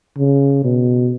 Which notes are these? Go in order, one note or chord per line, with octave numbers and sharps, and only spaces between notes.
C#3
B2